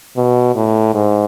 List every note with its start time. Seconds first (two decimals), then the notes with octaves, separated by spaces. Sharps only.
0.16 B2
0.55 A2
0.94 G#2